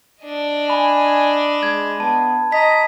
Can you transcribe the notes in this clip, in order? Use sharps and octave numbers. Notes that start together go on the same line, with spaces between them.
D4 D#5
G#5 B5
G#3 G#6
B3 A5
D#5 A#5 B6